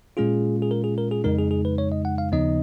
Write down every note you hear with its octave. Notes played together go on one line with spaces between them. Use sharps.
A#2 G#3 C#4 F4 G#4
G#4
A#4
G#4
A#4
G#4
F2 C#3 G#3 D#4 A#4
G#4
G#4
B4
C#5
D#5
F#5
F5
D#2 C#3 F3 B3 D#4 D#5